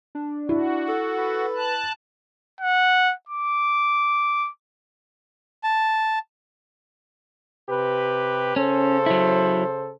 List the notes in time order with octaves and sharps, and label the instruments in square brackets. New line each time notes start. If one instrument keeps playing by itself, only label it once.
[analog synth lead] D4
[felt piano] E4 [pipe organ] F#4
[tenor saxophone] A4
[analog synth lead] B4
[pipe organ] A5 F#6
[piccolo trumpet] F#5
D6
[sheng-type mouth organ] A5
[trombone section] C3 G4 B4
[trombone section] C#3 A4 C5 [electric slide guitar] C#4
[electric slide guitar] F#3 E4